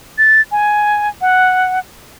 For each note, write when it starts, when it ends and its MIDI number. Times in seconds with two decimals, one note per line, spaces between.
0.18 0.41 93
0.52 1.09 80
1.21 1.79 78